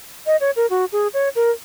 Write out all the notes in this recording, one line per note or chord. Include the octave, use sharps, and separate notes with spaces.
D#5
C#5
A#4
F#4
G#4
C#5
A#4